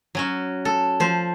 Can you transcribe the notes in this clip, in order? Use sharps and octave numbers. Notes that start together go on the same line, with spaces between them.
F#3 C#4 F#4
A4
F3 C5